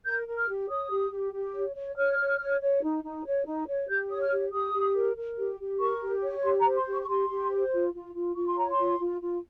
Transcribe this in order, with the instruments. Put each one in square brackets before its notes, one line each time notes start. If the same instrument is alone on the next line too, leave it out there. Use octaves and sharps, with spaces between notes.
[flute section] A#4 G6
A#4
F6
G4
C#5 D#6
G4
G4
G4
C#5
C#5
C#5 F6
C#5
C#5
C#5
D#4
D#4
C#5
D#4
C#5
G4 G6
C#5 D#6
F6
G4
G4 D#6
G4
A#4
A#4
G4
G4
A#4 C#6
G4
C#5
G4 C6
A#5
C5
C6
G4
C#6
C#6
G4 C6
G4
C5
F4
F4
F4
F4 C#6
C6
C#5 A#5
C6
F4
F4
F4